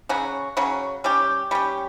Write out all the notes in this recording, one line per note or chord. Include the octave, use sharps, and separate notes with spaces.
C#3 F#3 C#4 F#4
C#3 F#3 C#4 F#4
G3 C#4 G4
G3 C#4 G4